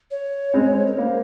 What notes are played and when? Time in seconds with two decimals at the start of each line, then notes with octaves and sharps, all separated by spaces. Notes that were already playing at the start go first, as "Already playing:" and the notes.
0.11 C#5
0.54 G#3 C4
0.87 A#4
0.97 A#3 C5 C#5